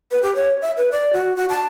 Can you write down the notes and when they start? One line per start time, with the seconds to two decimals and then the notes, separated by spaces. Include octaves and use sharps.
0.11 B4
0.23 G4
0.35 C#5
0.62 E5
0.77 B4
0.92 D5
1.13 F#4
1.36 F#4
1.49 A5